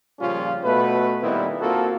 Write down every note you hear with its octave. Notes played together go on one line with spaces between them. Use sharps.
A#2 C#3 F3 G3 C#4 F4
B2 A3 B4
A#2 D#3 G3 B3 C4 E4
A#3 C4 F4 F#4 A4